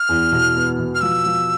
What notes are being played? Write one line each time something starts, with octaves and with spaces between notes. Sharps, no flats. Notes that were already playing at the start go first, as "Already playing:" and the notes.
Already playing: F6
E2
B2
B3
B2
F6
F3 E6
F3